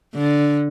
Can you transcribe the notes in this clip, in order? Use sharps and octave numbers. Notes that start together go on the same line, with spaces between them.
D3